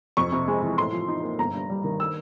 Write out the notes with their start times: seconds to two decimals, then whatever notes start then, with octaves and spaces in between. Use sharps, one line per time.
0.17 F2 C#6
0.32 C3
0.48 G#3
0.62 E3
0.78 A2 C6
0.92 F3
1.08 D#4
1.23 A#3
1.38 G1 A#5
1.54 G2
1.70 G3
1.84 D#3
2.00 E6